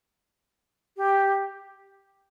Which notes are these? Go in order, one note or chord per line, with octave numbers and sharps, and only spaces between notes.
G4